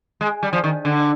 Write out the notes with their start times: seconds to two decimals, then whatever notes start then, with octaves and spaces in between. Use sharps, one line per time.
0.21 G#3
0.43 G3
0.53 F3
0.64 D#3
0.85 D3